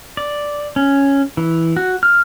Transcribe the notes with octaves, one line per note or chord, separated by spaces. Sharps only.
D5
C#4
E3
F#4
F6